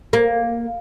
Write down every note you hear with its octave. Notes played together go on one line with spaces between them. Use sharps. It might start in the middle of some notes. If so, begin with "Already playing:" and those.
A#3